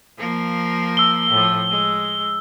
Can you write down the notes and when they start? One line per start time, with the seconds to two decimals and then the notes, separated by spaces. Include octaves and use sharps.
0.18 F3 A#3 A#4
0.97 E6 G7
1.31 A2 F3
1.70 G#3